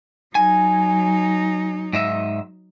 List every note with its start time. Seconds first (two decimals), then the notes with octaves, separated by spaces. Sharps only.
0.35 F#3 D#4 G#5
1.93 G#2 D#5 E5